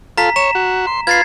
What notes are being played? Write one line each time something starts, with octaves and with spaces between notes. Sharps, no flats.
F4 A4 A#5 B6
C#5 A#5 E7
F#4
C6
F4 B4 G#6 A6 C7